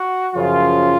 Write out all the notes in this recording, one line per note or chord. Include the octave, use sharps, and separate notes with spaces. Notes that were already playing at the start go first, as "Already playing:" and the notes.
Already playing: F#4
F#2 C#3 F3 F4